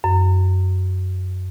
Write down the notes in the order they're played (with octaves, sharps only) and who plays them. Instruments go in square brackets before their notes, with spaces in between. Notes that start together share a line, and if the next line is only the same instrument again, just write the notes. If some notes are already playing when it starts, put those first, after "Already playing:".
[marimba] F#2